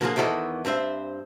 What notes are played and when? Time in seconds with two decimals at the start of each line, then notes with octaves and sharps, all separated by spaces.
0.01 D3 F3 A#3 C4 F4 G#4
0.16 E2 D#3 E3 F#4 A4 D#5
0.65 G2 C4 C5 E5